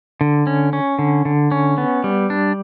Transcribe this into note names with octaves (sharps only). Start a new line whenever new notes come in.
D3
C#4
C#4
D3
D3
C#4
B3
G3
D4